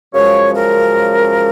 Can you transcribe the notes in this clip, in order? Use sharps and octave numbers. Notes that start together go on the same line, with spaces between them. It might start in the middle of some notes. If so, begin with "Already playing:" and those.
F#2 C#3 F3 G#3 C#5
A#4